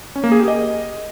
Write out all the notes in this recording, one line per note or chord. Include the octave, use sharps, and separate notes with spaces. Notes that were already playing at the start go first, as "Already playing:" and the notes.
C#4
A#3
G#4
G4
D#5